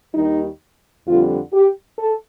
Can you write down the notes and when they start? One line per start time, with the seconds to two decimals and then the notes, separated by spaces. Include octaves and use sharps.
0.13 D#2 D#3 G3 D#4
1.06 F2 D3 G3 F4
1.53 G4
1.98 A4